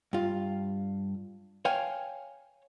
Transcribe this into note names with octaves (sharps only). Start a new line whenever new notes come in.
G2 F4
C#5 F5 G5 G#5